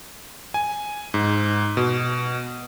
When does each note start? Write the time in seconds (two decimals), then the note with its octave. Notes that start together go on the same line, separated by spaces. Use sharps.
0.54 G#5
1.14 G#2
1.77 B2